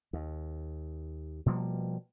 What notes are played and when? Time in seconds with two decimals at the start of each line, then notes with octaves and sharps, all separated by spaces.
0.13 D#2
1.46 B2 F3 G3 A#3